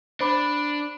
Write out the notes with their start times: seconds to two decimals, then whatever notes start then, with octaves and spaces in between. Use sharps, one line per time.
0.21 D4 C5 B5 D6